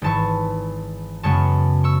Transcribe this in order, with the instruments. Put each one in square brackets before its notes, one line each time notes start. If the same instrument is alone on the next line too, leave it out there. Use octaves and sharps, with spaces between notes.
[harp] G#1 G#2 E3 A5 C#6
F#2 C#3 G#3 B3 A5 C#6
C#6 E6